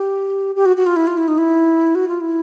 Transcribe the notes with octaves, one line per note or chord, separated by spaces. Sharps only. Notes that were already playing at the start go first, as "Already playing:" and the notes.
Already playing: G4
G4
F#4
F#4
F4
E4
F4
E4
D#4
E4
F#4
F4
E4